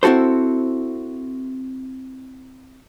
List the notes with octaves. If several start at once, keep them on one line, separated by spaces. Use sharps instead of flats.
C4 E4 F#4 A4 C5